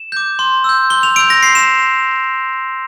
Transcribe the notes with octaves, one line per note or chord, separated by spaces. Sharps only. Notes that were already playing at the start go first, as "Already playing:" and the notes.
Already playing: E7
D6 G6
C6
E6 G6
C6 G7
F7
E6 G6 D7
A#6
C6 C7
E7